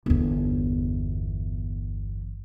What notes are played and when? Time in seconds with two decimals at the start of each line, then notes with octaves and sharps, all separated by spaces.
0.06 G1 E2